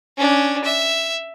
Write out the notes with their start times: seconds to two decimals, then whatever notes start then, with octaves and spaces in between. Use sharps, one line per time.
0.17 C#4 D4
0.64 E5